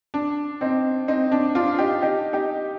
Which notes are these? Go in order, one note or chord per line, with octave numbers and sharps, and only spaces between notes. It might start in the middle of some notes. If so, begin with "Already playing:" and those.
D4
C4 D#4
C4 D#4
D4
D4 F4
D#4 G4
D#4 G4
D#4 G4